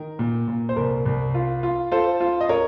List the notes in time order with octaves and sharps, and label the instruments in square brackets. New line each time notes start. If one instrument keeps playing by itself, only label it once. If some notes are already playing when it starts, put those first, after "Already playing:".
Already playing: [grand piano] D#3 A#4
A#2
A#2
C5
C2 A#4
C2
F4
F4
F4 A4 C5
F4
D#5
A#4 C#5